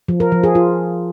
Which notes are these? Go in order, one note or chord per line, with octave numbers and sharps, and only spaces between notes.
F3
A#4
F3
G#4
F4